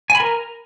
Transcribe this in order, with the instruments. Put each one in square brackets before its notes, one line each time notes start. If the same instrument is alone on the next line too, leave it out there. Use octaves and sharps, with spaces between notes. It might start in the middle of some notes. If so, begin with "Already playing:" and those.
[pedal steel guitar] G#5
B5
A#4